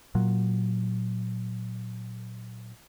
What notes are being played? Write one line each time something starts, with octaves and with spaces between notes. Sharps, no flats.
A#2 F#3